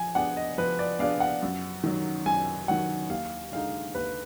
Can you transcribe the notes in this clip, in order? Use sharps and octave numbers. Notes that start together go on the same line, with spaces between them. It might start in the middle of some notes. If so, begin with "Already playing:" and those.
Already playing: F3 G#5
B3 D4 G#4 D5 F#5
D#5
F3 B4
D5
B3 D4 G#4 D5 F5
F#5
F#2
D#3 F#3
F#2 G#5
D#3 F#3 F#5
D#2 F5
D3 G#3 D#4 F5
D#2 B4